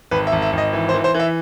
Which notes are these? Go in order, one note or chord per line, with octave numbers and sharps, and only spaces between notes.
G#1 B4
E5
G#1
E5
G#1
D#5
E3
C5
E3
C5
E3
E5